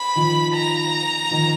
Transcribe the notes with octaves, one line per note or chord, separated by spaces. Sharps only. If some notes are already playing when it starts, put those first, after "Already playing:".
Already playing: B5
D#3 F3
A#5
D#3 F3